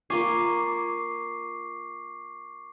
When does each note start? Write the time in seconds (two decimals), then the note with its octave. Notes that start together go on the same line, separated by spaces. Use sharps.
0.10 A#3 F4 G#5 C#6 D6 C7